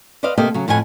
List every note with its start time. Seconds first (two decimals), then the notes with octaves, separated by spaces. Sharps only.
0.23 B4 C5 D5 D#5 F5
0.37 C3 A#3 G4 A4 D#5
0.54 C#3 F#3
0.68 F2 A2 A3 F#5 G#5